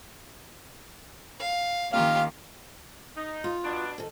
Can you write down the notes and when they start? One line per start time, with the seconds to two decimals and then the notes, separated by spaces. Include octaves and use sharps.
1.39 F5
1.93 D#3 A#3 C#4 F4 G4 F5
3.16 D#4
3.44 F4
3.64 B2 D4
3.98 D#3 A4